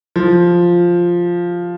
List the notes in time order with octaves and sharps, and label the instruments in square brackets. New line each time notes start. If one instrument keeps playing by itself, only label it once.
[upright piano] F3